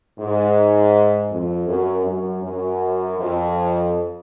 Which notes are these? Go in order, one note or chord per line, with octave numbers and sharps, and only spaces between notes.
G#2
F2
F#2
F#2
F#2
F2